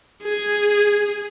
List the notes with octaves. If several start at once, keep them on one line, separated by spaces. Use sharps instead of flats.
G#4